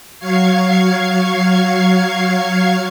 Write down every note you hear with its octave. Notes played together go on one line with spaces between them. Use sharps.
F#3 F5 C#6 G#6 C7